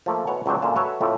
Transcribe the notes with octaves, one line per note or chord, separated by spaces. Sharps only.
F3 A3 A#3
B2 E3 C#5 F#5
C#2 F#3 C4 D4 C5
F#2 A#2 D3 F#3 F4 A5
F#4 A4 B4 C#5 E5
F2 A2 F3 A3